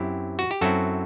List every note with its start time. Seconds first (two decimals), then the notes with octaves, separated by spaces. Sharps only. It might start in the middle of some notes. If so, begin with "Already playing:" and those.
Already playing: F#2 F#3 C4 E4 G4
0.39 F#4
0.51 G4
0.61 F#2 F#3 C4 E4 F#4 A4